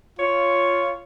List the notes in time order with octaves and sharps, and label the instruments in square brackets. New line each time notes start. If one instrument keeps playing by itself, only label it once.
[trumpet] F4 [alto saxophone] C#5